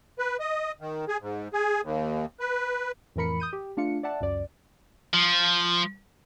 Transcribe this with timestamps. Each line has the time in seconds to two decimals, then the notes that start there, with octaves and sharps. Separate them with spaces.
0.19 B4
0.40 D#5
0.81 D#3
1.08 G#4
1.22 G#2
1.53 G#4
1.83 D#2
2.40 B4
3.16 F2 A2 E3 A#4 B5 C#7
3.40 D#6 G6 D#7
3.53 G4
3.77 A3 D4 F4 F5 C#7
4.03 D5 E5 F#5 A5
4.20 C#2 F#2 D5
5.13 F3